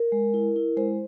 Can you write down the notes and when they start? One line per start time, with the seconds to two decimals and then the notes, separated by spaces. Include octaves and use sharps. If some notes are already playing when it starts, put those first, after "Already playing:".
Already playing: A#4
0.12 G#3
0.34 E4
0.56 E4
0.77 G#3 C5